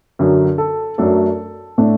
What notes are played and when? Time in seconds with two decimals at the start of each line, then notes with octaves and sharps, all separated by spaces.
0.19 F#2 D3 F#3
0.58 A4
0.98 F#2 F#3 A3 D4 A4
1.78 A2 A3 D4